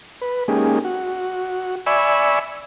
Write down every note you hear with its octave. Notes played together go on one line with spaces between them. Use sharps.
B4
G#3 A#3 C#4 D#4 G4 G#4
F#4
D5 E5 G#5 B5 C#6 E6